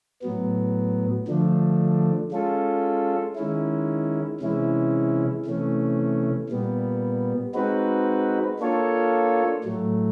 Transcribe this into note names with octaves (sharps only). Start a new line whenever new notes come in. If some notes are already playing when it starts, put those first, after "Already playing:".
A2 F#3 B3
D3 F3 A3 D4
G#3 C#4 F4 A4
D#3 G#3 C#4 E4
C3 E3 G#3 C#4 E4
C3 E3 A3 C#4
A#2 G3 B3
G#3 C4 D#4 F#4 B4
A#3 D4 F4 A4 C#5
A2 F#3 A3